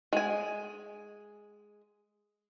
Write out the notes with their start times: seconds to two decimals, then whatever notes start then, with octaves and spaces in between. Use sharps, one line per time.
0.13 G#3 G#5